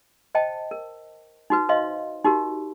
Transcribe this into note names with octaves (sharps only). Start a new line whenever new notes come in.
C5 D#5 G5 A5
A#4
D#4 F#4 B4
B4 C5 D#5 F5 C6
D#4 F#4 G4 A#4